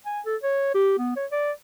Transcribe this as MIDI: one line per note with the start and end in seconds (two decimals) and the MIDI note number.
0.06 0.20 80
0.26 0.36 69
0.43 0.73 73
0.75 0.96 67
0.98 1.12 59
1.17 1.26 73
1.31 1.52 74